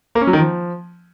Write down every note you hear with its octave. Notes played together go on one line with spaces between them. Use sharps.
A#3
C#4
F#3
D#3
F3